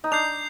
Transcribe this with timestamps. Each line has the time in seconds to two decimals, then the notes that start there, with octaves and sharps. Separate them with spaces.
0.04 D#4
0.11 D4 G6 C7 F7